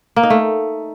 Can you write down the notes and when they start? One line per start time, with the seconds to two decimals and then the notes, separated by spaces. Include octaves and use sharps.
0.16 A#3
0.23 D#4
0.30 A3